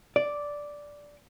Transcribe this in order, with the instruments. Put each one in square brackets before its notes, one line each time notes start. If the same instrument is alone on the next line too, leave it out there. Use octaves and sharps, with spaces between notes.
[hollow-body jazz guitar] D5